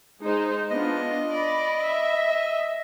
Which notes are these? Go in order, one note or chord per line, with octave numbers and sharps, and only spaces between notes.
G#3 D#4 C5
B3 D4 F4 D#5
D5 B5
E5